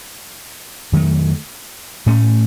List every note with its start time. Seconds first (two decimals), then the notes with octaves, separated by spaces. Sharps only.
0.92 F2 D#3 F#3 A3
2.06 A2 A3 C#4